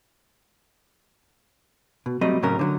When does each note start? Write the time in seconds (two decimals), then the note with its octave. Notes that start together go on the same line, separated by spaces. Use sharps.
2.06 B2
2.21 F#3 G3 A3 C4 D#5
2.43 A2 C#3 F#3 C#4 A#4
2.59 D3 F3 F#3